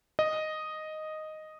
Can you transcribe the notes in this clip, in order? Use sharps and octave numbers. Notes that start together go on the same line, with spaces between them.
D#5